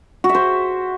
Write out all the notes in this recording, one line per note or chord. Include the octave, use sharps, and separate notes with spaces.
F#4
E5
C5